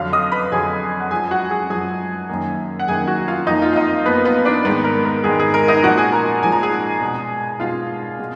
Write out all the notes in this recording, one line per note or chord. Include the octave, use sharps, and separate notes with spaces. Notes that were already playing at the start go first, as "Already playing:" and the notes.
Already playing: F2 D3 F#3 F5 F6
D#5 D#6
B4 B5
F2 D3 F#3 G#4 G#5
F#5
F#2 F3 G#3 G#4 G#5
F#4 F#5
G#4 G#5
F#2 F3 G#3 G#4 G#5
F#2 D#3 A#3
F#5
F#2 D#3 A#3 G#4 G#5
F#4 F#5
F4 F5
F2 F3 A#3 D#4 D#5
F4 F5
F5
D#4 D#5
F2 F3 A#3 B3 B4
B3 B4
D4 D5
G#2 D#3 G#3 B3 B4
A#4
A#4
G#2 D#3 G#3 G#4
G#4
A#4
D#4 D#5
A#2 F3 G#3 F#4 F#5
G#4 G#5
A#4 A#5
A#2 F3 G#3 G#5
A#5
G#4 G#5
B2 G#3
B2 G#3 F4 F5
B2 G#3